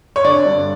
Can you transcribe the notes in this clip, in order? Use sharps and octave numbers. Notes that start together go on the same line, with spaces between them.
C#5
D3 D5
G2